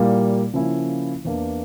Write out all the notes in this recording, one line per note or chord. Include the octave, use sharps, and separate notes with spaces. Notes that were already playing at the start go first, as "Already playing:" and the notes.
Already playing: A#2 G3 A#3 E4
C#3 F3 A#3 C#4 E4
E2 E3 A#3 D4